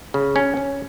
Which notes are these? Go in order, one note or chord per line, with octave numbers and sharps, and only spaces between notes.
C#3
C#4
C#4